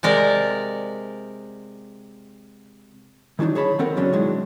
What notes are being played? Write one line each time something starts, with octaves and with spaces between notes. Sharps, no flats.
C3 G#3 A#4 D5
D#3 E3 F#3 D4 D#4
G#4 C#5 A5 B5
D#3 B3 C4 A4 A#4 F#5
F#2 C#3 F#3 C#4 D4
B2 D#3 F#3 G#3 D4 E4